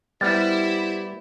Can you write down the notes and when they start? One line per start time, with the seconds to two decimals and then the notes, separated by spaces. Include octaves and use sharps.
0.21 G3 B3 E4 G4 C5 A6